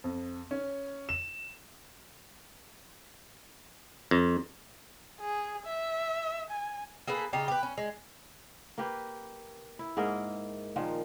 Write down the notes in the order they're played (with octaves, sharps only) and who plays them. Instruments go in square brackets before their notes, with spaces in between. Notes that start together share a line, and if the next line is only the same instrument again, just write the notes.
[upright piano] F2
C#4
E7
[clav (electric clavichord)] F2
[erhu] G#4
E5
G#5
[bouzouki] A#3 G#4 A4 B4
C#3 D#4 F4 G4
G4 B4
C#4
G#3
[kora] A#3 G4 B4
E4
G#2 A#3 G#4 A#4
A#2 D#3 F3